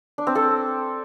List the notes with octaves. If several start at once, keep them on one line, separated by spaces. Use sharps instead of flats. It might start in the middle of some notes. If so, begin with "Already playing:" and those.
D4
C4
A4